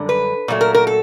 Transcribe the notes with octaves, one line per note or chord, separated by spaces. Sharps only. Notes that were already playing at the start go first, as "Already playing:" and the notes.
Already playing: F#2 D3 G3
B4
A#2 F#3 A3
A#4
A#4
A4